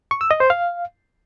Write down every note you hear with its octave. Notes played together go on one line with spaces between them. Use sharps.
C#6
E6
D#5
C5
F5